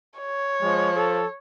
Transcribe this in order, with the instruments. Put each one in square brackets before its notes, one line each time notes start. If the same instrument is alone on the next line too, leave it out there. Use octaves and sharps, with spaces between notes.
[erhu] C#5
[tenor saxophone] F3 [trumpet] G#3
[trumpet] A4